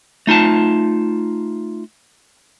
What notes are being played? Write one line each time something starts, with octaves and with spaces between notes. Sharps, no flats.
A3 D#4 F4 A5